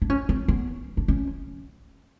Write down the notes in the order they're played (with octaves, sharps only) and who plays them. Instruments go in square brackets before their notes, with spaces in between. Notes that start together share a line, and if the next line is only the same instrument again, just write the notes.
[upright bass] D4
C#4
C4
B3
D4
C#4